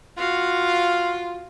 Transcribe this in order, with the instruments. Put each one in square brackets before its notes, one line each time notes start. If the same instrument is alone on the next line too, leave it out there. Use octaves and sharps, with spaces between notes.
[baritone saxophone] F4 [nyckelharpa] F#4 F5